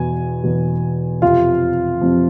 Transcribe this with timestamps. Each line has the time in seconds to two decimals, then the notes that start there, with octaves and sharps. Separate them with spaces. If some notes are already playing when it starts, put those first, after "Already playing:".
Already playing: E2 B2 G#5
0.43 E2 B2
1.22 F2 C3 F3 F4 F5
2.01 F2 C3 F3